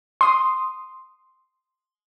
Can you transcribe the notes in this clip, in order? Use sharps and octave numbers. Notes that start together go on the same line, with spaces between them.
C6 D#6